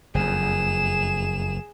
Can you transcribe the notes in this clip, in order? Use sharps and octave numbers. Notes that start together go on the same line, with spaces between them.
F#1 F2 G#4 E7